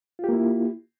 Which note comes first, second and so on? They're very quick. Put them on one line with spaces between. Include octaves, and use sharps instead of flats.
F4 G4 A#3 E4